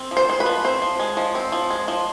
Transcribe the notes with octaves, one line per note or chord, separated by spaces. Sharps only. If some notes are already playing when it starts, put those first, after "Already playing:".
Already playing: C4
F3
C5
G#3 C5
B4
F3
C4 C5
F3
G#3
F3
C4
F3
G#3
F3